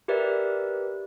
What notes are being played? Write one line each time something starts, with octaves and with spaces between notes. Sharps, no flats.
G4 A#4 B4 D5 E5